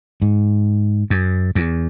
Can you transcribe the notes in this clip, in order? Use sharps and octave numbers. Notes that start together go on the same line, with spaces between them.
G#2
F#2
E2